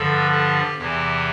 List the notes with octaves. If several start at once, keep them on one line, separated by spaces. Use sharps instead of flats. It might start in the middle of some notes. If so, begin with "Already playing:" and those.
Already playing: G2 D3 F3 A4
G4
E2 C3 E3 G4